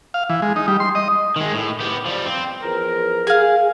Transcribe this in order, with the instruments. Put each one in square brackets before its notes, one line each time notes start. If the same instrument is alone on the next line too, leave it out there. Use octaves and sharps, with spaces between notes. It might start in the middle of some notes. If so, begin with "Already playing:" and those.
[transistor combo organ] F5
E3
G#3
D#4
G3
C6
D#5
[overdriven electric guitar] D#3 G#3
A2
B3 G4
F3 G3
C4
[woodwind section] E2 F3 A#4
[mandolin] G#4 F5